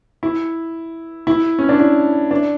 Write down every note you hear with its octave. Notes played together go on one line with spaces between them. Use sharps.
E4
E4
C#4
D4
E4
D4